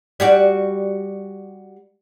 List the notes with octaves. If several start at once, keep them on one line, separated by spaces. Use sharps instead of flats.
G3 F#4 D5